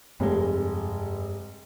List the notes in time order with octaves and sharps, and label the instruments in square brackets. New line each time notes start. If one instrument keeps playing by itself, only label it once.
[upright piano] F1 [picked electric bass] G2 G#3